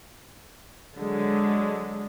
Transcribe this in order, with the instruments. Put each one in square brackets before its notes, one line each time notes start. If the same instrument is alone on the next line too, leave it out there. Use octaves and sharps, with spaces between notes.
[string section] D3 F#3 G#3